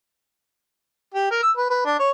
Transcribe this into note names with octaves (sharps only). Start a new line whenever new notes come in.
G4
A#4
E6
B4
B4
D4
C#5